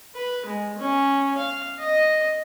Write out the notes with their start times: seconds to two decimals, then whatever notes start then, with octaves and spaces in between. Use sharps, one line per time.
0.15 B4
0.46 G#3
0.78 C#4
1.38 F5
1.79 D#5